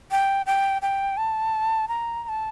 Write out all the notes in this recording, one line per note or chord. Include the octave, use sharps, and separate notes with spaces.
G5
G5
G5
A5
A#5
A#5
A5